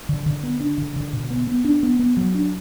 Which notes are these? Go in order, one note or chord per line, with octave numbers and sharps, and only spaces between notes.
D3
D3
B3
D4
D3
D3
B2
B3
B3
D4
B3
B3
F#3
D4